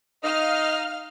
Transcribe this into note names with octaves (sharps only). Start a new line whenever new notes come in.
D#4 D#5 F5 F6